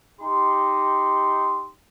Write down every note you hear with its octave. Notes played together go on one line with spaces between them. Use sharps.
D#4 G4 C6